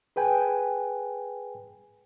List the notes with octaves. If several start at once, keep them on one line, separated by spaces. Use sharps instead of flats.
G#4 B4 G5 G#5